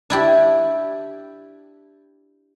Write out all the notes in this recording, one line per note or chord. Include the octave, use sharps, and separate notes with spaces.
D4 E4 G4